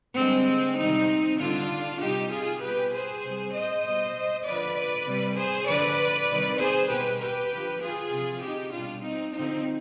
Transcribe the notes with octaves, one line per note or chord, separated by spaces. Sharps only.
D3 G3 G#3 C4
C3 D#3 G3 C4 D#4
D3 G3 D4 F4
C3 G3 D#4 G4
F4 G#4
B2 G3 G4 B4
G#4 C5
C3 G3
C5 D#5
B2 G3
D3 F3 B4 D5
C3 G3
G#4 C5
D3 F3 B4 D5
C3 D#3 G3
G#4 C5
B2 G3 G4 B4
G4 B4
D3 F3
F4 G#4
C3 F3
D#4 G4
B2 G3 D4 F4
C4 D#4
D3 F3 C4 D#4